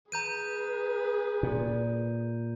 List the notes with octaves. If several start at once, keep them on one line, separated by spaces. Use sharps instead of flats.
G#4 B4 A#5 G6 D#7
A#2